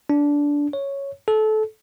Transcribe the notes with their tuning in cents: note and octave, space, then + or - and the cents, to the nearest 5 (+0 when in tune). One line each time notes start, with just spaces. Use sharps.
D4 -15
C#5 +0
A4 -25